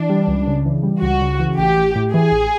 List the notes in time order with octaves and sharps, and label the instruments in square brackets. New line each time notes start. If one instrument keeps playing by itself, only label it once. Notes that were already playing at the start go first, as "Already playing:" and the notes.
Already playing: [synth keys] E3 [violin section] D4
[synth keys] G3
C#2
C#3
E3
G3
[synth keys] C#2 [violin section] F#4
[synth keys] C#3
E3
[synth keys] A1 [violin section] G4
[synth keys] A1
A2
[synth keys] E3 [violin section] G#4
[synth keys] A1